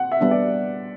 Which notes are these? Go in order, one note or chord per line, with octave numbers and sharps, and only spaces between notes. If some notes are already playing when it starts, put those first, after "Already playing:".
Already playing: F#5
E5
G3 B3 D4
D5